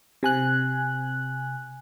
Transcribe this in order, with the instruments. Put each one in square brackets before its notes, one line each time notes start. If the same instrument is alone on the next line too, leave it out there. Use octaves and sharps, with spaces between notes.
[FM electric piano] C3 G#5 F#6